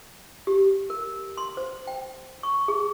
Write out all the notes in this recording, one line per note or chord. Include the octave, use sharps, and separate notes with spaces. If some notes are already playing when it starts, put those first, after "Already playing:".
G4
A#4
C6
C5
G5
C#6
G#4